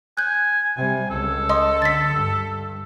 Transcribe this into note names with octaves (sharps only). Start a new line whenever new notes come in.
G#5 F#6 G6
C3 G3 G#5
C#2 A4
D#5 C6 D#6
D3 A6 B6
G2